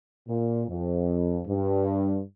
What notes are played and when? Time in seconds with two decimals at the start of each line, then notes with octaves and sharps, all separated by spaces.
0.28 A#2
0.68 F2
1.48 G2